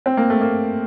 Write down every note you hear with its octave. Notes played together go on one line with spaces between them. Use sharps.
C4
A#3
A3
A#3